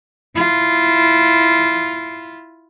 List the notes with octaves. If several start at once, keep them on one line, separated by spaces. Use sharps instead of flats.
E4 F4